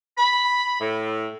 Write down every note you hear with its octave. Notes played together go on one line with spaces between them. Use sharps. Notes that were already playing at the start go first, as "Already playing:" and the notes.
B5
A2